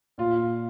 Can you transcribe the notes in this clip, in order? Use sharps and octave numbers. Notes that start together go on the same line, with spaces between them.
A#2 F4